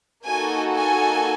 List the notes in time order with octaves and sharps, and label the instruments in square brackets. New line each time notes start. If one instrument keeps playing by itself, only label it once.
[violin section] A#3 D#4 F#4 A4 G#5
G#5